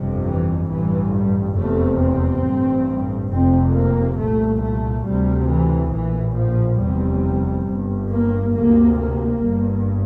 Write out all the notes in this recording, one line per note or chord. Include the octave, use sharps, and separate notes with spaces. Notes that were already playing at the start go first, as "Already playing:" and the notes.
Already playing: G1 F2 C3
E3
A1 G2 E3
G3
F1 E2 C3 A3
C4
A1 G2
F1 F2 C3 C4
A#3
C2 A#2 A3
A3
D2 C3 G3
E3
A#1 A2 E3
F3
F1 E2 C3 G3
G1 G2
A#3
D2 C3 A#3
A#3
G1 G2